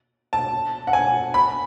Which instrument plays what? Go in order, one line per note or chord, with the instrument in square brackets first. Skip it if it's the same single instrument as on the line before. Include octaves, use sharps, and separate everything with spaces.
[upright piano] A5
F#5
G#5
B5